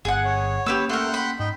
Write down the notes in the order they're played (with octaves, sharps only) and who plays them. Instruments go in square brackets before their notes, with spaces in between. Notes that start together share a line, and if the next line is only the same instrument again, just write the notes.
[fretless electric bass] G1 B3 [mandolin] G#4 F#5
[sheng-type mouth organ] C#5
[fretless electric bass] A#3 C#4 [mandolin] G4 B4 E6
[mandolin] A3 A#4 [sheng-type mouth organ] F#5 G5 C6
[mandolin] B5
[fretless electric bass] G#2 [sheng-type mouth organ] D#4 G5